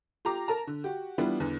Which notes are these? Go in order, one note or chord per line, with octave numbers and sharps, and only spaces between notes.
F4 G4 A#5 D6
A#4 A5 A#5
D3
F#4 G4
E3 G3 B3 D4 E4 F4
E2 D3 E3